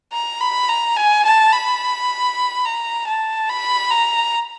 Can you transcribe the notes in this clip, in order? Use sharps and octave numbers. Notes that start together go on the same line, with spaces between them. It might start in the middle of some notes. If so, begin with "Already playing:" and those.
A#5
B5
A#5
G#5
A5
B5
A#5
A5
B5
A#5